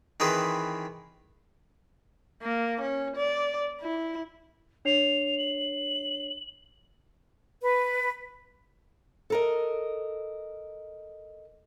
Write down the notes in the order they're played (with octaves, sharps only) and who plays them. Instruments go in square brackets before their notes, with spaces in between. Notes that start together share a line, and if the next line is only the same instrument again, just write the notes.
[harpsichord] D#3 E3 C4 G#4 B4
[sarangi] A#3
C#4
D5
E4
[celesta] D4 C#5 C7 [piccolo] F7
[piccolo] F#7
[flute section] B4
[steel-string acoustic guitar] A4 A#4 D#5